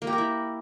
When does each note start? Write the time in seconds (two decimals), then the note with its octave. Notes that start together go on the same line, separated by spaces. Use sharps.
0.02 A#3
0.07 G4
0.13 A#4
0.18 E4